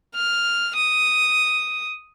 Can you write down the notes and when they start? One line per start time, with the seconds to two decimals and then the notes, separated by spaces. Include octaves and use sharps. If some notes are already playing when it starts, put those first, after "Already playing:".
0.15 F6
0.76 D#6